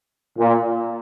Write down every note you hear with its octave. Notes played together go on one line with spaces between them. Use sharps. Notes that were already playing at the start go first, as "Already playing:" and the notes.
A#2